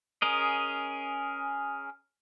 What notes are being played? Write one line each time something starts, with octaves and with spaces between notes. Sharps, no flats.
C#4 G#4 A#4 D#5